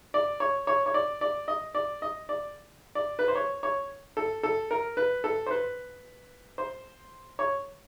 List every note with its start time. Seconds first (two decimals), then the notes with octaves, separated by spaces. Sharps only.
0.14 D5
0.40 C#5
0.67 C#5
0.86 C#5
0.94 D5
1.21 D5
1.48 D#5
1.75 D5
2.02 D#5
2.29 D5
2.95 D5
3.19 B4
3.28 C5
3.35 C#5
3.63 C#5
4.17 A4
4.43 A4
4.71 A#4
4.97 B4
5.24 A4
5.46 C5
5.51 B4
6.58 C5
7.39 C#5